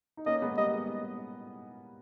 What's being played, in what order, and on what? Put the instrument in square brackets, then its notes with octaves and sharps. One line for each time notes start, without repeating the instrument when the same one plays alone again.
[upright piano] D#4
[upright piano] A#3 C#4 [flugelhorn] D#5
[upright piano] G#3 B3
[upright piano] G3 A#3 [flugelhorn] D#5
[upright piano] G#3